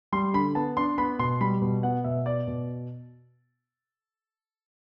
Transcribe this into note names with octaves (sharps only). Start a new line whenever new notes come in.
G3 C6
D3 B5
B3 A5
D4 C6
B3 B5
B2 C6
G3 B5
B2
B3 F#5
B2 E5
B3 D5
B2